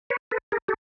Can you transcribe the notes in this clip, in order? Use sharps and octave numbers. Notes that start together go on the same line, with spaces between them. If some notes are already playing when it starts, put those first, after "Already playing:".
B4 C#5
A4 B4
G#4 A#4
G4 A4